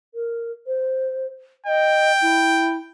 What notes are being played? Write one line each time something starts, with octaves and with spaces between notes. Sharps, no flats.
A#4
C5
D#5 G5
E4